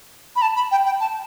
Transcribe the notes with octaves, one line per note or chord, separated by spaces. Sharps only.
B5
A5
B5
G5
G5
A5